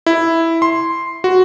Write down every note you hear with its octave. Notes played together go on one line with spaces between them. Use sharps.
E4
C6
F#4